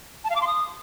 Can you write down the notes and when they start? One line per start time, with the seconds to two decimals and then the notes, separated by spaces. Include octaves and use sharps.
0.24 A5
0.30 F5
0.36 D6
0.41 C6
0.47 D#6